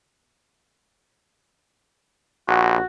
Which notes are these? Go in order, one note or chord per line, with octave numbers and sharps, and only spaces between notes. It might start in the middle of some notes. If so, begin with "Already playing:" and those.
A#1 F#4